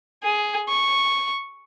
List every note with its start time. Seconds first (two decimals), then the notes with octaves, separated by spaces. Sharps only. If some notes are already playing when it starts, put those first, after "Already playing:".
0.23 G#4
0.69 C#6